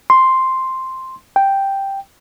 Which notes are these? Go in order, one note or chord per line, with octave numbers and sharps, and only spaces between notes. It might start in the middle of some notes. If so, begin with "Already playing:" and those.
C6
G5